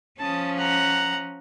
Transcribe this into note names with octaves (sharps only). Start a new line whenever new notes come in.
F3 C#4 A5 D#6
F#5 A#5